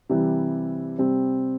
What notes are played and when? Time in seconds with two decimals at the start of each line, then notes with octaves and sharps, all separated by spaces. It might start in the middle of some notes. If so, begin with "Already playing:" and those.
0.09 C3 E3 G3
0.98 C3 G3 C4